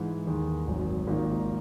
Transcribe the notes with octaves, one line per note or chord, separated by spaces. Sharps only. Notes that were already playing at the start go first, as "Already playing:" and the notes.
Already playing: G#2 E3 G#3
D#2 D#3 G#3
G#1 F#2 D#3 F#3
A#1 G#2 D#3 A#3